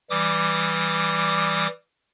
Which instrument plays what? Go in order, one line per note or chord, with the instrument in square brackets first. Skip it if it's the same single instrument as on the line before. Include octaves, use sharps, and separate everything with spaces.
[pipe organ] E3 G3 D6 D#6